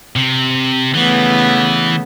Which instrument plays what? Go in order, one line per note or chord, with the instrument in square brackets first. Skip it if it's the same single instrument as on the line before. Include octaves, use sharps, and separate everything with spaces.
[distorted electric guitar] C3
[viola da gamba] C#3 A3 B3 [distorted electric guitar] E3